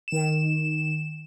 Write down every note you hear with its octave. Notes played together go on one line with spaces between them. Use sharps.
D#3 E7